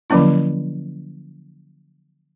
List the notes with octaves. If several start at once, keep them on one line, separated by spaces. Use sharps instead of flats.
D3 F3 F#3 A#3 C#4 E4